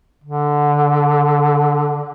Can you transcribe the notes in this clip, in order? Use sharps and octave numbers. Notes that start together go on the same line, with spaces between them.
D3